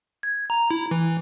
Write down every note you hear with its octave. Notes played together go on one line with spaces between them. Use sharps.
G#6
A#5
E4
E3